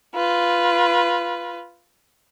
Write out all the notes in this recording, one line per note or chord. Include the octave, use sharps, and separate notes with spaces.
F4 B4